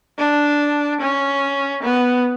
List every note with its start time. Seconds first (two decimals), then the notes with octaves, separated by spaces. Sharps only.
0.19 D4
1.01 C#4
1.83 B3